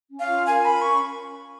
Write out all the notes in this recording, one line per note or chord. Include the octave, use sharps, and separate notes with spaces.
C#4
F5
F4
A#4 G#5
A#4 B5
C#4 C#6